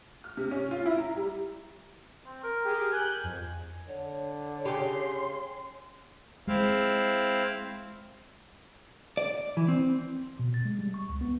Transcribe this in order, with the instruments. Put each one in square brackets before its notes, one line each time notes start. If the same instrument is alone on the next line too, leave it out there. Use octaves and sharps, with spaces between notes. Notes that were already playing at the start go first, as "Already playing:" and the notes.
[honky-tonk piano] F6
C3
C#4
F4
E4
A#5
G3
[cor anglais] C4
A#4
[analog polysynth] G4 G#4
[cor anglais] G#5 [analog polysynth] F#6 G6
[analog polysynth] F2
[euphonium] D3 [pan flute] C#5
[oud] C#3 G4 [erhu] C6
[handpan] G#3 [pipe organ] C4 E4 F5
[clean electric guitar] D5
E3
C4
[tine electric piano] B2
A6
G#3
G3
C#6
C#2
B3